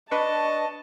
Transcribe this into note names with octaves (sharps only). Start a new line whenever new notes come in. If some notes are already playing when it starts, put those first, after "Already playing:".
D4 B4 D#5 A5 C#6